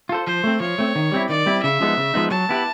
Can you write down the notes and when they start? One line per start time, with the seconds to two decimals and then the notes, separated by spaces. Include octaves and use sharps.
0.09 F4 A4 C5
0.27 F3 C5
0.44 A3 C4
0.60 F3 C#5
0.78 A3 C4
0.95 D#3
1.11 G3 C4 E4
1.29 D#3 D5
1.46 G3 C4 E4
1.63 C#3 E5
1.81 F3 G#3 B3 D#4
1.97 C#3
2.14 F3 G#3 B3 D#4
2.31 F#3 A5
2.49 B3 E4 G4 B4